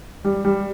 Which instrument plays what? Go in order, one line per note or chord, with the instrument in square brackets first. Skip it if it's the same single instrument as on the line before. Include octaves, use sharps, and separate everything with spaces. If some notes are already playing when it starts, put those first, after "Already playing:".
[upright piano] G3
G3